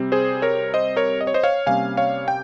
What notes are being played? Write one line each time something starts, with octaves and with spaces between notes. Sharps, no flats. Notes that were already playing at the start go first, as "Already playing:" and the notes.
Already playing: C3 G3 C4
G#4 C5
A#4 C#5
C5 D#5
A#4 C#5
D#5
C#5
C5 D#5
C#5 F5
C3 G3 A#3 C#4 F5 G#5
C#5 F5
G5